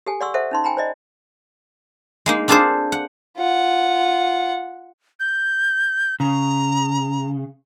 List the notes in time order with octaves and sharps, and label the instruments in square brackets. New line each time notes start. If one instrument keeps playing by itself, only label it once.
[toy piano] G4 A4 G#5
D5 F#5 C6 C#6 E6
A4 C5 E5 F#5
C#4 D#4 C6
G5 G#5 A#5 B5
C5 D5 D#5
[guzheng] G#3 A#3 D#4
C4 D4 F4 G#4 A4 C5
F#5
[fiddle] F4 F#5
[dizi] G6
[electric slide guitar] C#3 [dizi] A#5